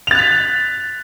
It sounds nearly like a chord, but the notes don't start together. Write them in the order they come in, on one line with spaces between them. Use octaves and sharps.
F7 A6 F#6 B6